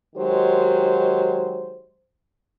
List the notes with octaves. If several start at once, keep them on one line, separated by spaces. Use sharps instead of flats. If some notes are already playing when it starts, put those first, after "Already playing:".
D#3 F#3 G#3 G4 C5